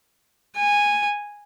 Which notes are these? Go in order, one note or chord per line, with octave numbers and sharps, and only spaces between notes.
G#5